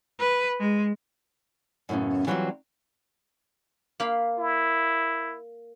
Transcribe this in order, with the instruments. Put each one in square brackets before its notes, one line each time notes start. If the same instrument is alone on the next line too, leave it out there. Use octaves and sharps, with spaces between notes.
[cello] B4
G#3
[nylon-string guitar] F#2 A2 C#3 B3 C#4
E3 F#3 G3 C4 F4 F#4
[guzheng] A#3 F5 B5
[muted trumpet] E4